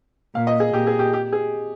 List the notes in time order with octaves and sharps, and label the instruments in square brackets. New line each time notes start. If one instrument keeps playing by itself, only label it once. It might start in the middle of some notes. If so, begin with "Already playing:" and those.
[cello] A#2 [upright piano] F5
[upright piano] D#5
G#4
[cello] A#2 [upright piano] G4
[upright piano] G#4
G4
G4
G#4